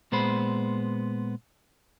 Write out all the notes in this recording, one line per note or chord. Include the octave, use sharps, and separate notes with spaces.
A#2 G#3 B3 C5 B5